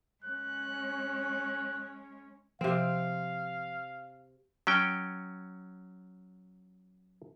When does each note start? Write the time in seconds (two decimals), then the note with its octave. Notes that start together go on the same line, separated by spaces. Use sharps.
0.24 G#3 C#4 F#6
2.61 C3 F3 C4 F5
4.67 F#3 C#4 G5